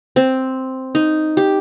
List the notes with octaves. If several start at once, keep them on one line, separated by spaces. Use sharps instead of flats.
C4
D#4
G4